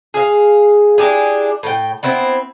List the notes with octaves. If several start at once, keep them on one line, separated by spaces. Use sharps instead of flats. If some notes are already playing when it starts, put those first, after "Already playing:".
G#4 F5
D4 E4 G4 G#4
A2 G5
B3 C4 E4